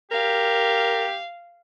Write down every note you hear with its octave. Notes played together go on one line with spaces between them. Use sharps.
G4 A#4 F5